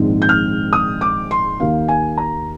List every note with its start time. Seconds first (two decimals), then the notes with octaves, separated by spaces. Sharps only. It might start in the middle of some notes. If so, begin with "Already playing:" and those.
Already playing: A#1 G#2 D#3 G#3 C4
0.22 G6
0.29 F6
0.73 D#6
1.01 D6
1.31 C6
1.60 D#2 D#3 A#3 F5
1.88 G#5
2.18 A#5